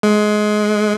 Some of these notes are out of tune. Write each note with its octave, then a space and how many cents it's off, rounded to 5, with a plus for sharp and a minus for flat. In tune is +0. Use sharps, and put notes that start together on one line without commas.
G#3 +20